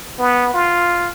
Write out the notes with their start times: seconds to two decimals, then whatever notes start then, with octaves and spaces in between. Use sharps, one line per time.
0.19 B3
0.54 F4